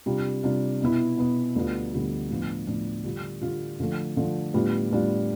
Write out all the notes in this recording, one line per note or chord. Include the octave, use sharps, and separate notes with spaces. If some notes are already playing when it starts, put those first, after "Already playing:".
C3 G3 D4 F4
C3 G3 D4 F4
B2 B3 E4
B2 B3 E4
D2 D3 G3 B3 F4
D2 D3 G3 B3 F4
A2 F3 B3 D4
A2 F3 B3 D4
D3 G3 D4 F4
D3 G3 D4 F4
D3 F3 A3
D3 F3 A3
A2 G3 B3 D4 F4
A2 G3 B3 D4 F4